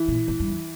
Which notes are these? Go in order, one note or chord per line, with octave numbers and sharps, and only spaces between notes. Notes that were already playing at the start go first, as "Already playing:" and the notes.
Already playing: E3
A#2
G#2
G2
E2